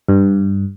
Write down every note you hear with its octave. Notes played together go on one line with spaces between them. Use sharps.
G2